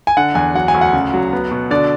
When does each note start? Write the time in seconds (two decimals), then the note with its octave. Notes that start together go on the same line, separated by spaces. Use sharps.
0.07 G#5
0.17 D3 F#5
0.35 E2 G#5
0.54 F#3 F#5
0.68 G#5
0.74 D2
0.81 F#5
0.93 C#3
1.14 F#3
1.33 B3
1.51 B2
1.71 D3 D5